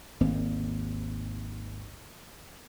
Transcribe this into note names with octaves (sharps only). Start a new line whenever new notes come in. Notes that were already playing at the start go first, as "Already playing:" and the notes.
G#1 D#2 A#3 C4